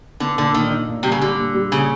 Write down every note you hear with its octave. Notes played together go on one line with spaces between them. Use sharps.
D3 B3
A#2 D3
A#2 D#3
D#4
A#2
C3 G3
C#3
D3 G3
A#2
G3
A#2 C#3